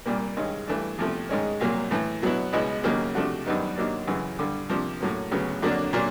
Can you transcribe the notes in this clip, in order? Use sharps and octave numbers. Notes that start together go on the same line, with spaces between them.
C2 A#2 G3 A#3
G2 D#3 G#3 C#4
G2 E3 A3 D4
E2 C3 F3 A3
G#2 D#3 G#3 C#4
C2 A#2 F#3 A#3
A2 E3 A3
B2 F#3 B3 E4
C#2 B2 G#3 B3 E4
D#2 C#3 F#3 A#3 D#4
C3 F3 A3 D4 F#4
F#2 D#3 G3 B3 D#4
D#2 D#3 F#3 A#3 D4
F#2 C#3 E3
G2 D3 G3
C3 F3 A#3 D4
A2 F#3 A#3 C#4
D2 C#3 F#3 B3
F2 D3 F#3 A#3 D4
A#2 F#3 A#3 D4